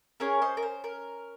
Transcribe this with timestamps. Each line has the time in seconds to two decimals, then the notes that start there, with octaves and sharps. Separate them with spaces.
0.20 C#4 G#4 A#4 C#5
0.42 C5 D#5
0.57 A#4
0.62 C5
0.84 A#4